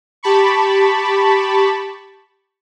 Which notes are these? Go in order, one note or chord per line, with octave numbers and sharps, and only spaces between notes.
G4 A5 B5 C#6